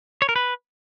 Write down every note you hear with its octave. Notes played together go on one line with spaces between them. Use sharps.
C#5
A#4
B4